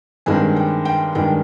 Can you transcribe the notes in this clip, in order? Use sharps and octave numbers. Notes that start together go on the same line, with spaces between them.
G2 D#3 G#3 C4 G#5
G5
G5
G2 D#3 G#3 G5